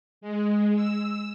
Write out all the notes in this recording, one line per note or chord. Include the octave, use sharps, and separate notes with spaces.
G#3
E6